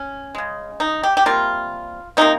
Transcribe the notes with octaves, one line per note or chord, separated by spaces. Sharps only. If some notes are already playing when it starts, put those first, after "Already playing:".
Already playing: C#4
C#3 G#3
D#4
G4
G4
C3 G3 A#3 F4
C3 F3 A#3 D#4